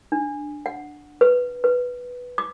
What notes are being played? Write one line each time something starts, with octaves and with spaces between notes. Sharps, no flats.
D4
F#5
B4
B4
D6